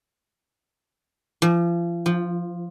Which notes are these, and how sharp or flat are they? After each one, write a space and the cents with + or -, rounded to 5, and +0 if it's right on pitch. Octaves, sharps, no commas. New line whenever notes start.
F3 -35
F3 +0